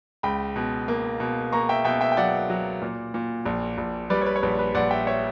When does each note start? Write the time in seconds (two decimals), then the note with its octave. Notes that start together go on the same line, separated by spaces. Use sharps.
0.23 C#2 G5 B5
0.56 B2
0.88 A#3
1.20 B2
1.52 A#3 A#5 C#6
1.69 E5 G5
1.85 B2 E5 G5
2.01 E5 G5
2.12 G5
2.17 F#3 D5 F#5
2.50 F#3
2.82 A#2
3.14 A#2
3.46 A#1
3.78 A#1
4.10 G3 B4 D5
4.21 C#5
4.26 B4
4.36 C#5
4.42 A#1 B4
4.59 B4
4.75 A#1 D5 F#5
4.91 E5 G5
5.07 C#5 E5